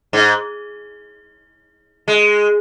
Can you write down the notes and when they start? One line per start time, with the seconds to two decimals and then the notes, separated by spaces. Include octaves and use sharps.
0.13 G#2
2.08 G#3